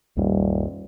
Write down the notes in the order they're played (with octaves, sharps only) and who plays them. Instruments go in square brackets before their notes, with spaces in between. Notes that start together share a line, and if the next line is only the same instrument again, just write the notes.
[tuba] D#1 [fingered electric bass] C2 F#2 G3